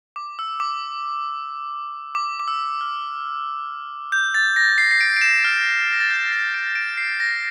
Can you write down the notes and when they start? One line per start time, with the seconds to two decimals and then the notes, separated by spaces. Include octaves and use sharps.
0.16 D6
0.39 E6
0.60 D6
2.15 D6
2.40 D6
2.48 E6
2.81 F6
4.12 G6
4.34 A6
4.56 A#6
4.78 C7
4.91 C7
5.01 D7
5.17 D7
5.21 E7
5.44 F6
5.92 A#6
6.00 A6
6.10 G6
6.32 C7
6.54 D7
6.75 D7
6.97 C7
7.20 A#6